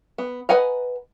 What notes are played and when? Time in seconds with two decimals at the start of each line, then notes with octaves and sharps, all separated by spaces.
0.18 B3
0.49 B4 D#5 F#5 G#5 A#5